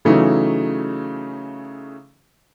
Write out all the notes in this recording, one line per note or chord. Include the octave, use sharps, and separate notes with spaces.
C#3 E3 F#3 A3 C#4 D#4